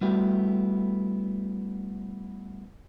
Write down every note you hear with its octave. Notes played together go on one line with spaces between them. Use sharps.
G3 A3 B3 E4 F#4 G4